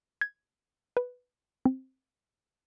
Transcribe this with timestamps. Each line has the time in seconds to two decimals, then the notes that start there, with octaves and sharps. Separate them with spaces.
0.21 G#6
0.97 B4
1.65 C4